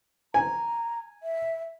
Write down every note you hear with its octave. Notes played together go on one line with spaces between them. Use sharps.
G#5 A#5
E5